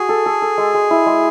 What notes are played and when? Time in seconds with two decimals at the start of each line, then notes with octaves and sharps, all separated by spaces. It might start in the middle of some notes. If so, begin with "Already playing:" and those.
Already playing: F#4 G#4
0.09 A4
0.26 A4
0.42 A4
0.58 G#3
0.74 G#3
0.91 E4
1.06 G#3